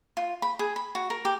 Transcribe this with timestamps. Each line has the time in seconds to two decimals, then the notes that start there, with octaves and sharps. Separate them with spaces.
0.17 F4
0.42 B5
0.59 G#4
0.76 B5
0.95 F#4
1.10 A#4
1.25 G4